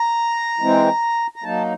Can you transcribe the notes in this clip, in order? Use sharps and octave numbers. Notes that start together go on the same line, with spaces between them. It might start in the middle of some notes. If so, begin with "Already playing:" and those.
Already playing: A#5
E3 G#3 C4
A#5
F#3 A#3 D#4 A5